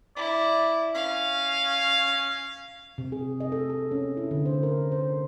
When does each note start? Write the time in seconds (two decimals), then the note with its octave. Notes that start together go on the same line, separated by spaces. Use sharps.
0.16 E4 D5
0.95 C#4 F5
2.98 C3
3.12 G#4
3.40 D#5
3.52 A4
3.69 A4
3.91 C#4
4.17 E4
4.31 D3
4.46 C5
4.63 A#4
4.92 C5